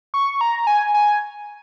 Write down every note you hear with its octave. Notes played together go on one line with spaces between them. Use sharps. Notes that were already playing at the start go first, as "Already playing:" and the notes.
C#6
A#5
G#5
G#5